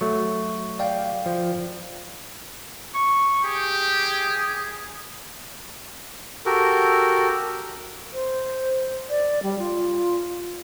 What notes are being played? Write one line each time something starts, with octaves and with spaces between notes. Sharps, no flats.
F#3 A3 C#6
D5 F5 G5
F3
C#6
G4 G#4
F#4 G4 A4 A#4
C5
D5
G3
F4